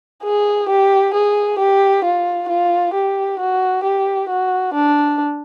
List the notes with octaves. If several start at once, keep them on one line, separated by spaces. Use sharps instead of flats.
G#4
G4
G#4
G4
F4
F4
G4
F#4
G4
F#4
D4